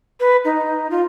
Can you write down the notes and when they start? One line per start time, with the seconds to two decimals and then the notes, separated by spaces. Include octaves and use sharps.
0.20 B4
0.45 D#4
0.90 F4